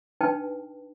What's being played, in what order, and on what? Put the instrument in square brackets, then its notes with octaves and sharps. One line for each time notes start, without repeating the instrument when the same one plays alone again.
[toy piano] D4 D#4 B4 G5 A5